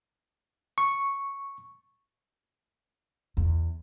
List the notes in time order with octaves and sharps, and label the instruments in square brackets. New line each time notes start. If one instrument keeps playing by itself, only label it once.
[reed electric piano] C#6
[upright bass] E2